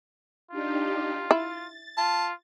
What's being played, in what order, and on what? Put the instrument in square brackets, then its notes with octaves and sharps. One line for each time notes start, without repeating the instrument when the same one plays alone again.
[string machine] D4 D#4 G4 [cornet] F4
[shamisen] E4 [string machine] A6
[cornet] F4 [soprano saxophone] A5